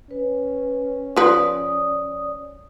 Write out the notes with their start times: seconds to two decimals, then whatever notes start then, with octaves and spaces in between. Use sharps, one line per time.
0.11 C#4 B4
1.16 F3 B4 D5 D#6